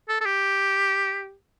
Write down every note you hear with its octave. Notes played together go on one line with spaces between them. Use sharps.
A4
A4
G4